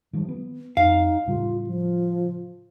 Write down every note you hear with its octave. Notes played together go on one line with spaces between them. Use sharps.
D#3 F3 G3
B3
F2 D#4 F5
A2 C#3 G3 F4
F3